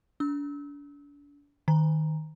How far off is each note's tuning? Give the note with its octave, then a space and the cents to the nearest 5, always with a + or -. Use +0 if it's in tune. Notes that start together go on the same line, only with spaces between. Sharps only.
D4 -35 E6 -30
D#3 +0 A#5 +0